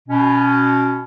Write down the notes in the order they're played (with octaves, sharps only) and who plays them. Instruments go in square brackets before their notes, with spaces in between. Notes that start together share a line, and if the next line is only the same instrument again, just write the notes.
[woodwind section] B2 C#4